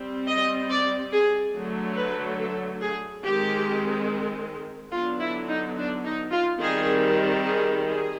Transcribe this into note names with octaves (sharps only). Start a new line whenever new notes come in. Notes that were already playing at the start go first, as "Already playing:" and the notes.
Already playing: G3 C4
D#5
D5
G#4
D3 F#3 A3
B4
A4
G#4
D#3 G#3 C4 G4
D3 F#3 B3 D4 F4
E4
D#4
D4
D#4
F4
D#3 G3 C4 G#4
G#4
G#4